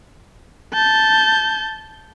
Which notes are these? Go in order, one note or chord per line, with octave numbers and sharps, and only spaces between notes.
A5 G6